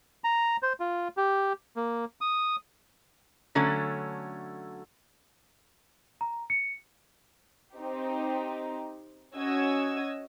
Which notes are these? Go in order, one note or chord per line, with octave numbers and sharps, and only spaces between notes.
A#5
C5
F4
G4
A#3
D#6
D3 F#3 A3 C#4
A#5
C#7
C4 D#4 G4
C#4 F#4 D#5 E6 G#6